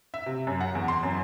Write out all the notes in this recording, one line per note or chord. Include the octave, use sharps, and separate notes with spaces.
E5
C3
F#2
F#5
E2
C6
F#2